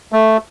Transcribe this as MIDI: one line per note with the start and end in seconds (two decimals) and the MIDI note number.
0.12 0.37 57